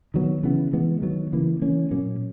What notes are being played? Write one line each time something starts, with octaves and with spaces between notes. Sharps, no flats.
D#3 F#3 B3
C#3 E3 B3
E3 G#3 B3
D#3 F#3 B3
C#3 E3 A#3
E3 A#3 C#4
A#2 F#3 A#3 C#4